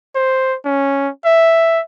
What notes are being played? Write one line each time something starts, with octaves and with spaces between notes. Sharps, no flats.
C5
C#4
E5